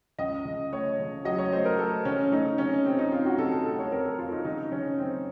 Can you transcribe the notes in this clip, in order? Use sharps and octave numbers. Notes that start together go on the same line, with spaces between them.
C#2 D#5
C#3
A3 C#5
C#3
F#3 D#5
C#5
A3 C5
A#4
A3 A4
C#3 C#4
A3 D#4
C3 C#4
C3 C4
D#4
F2 F4
F#4
C3 A4
A4
C3 A4
C#5
F2 A#4
A4
F2 F4
D#4
C#3 D#4
C#3 C#4
F#2 C4